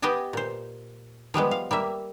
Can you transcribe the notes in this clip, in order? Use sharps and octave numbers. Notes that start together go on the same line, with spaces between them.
B3 G4 D#5 G#5 A5
A#2 C5
F3 G3 G#3 B3
F5
G3 A#3 E5